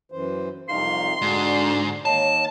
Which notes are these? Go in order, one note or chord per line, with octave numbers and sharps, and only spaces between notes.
F#2 E3 C5
C2 F2 D#4 F5 C6
G#2 D3 F#4 D5
D#3 A#3 C#5 D#5 A5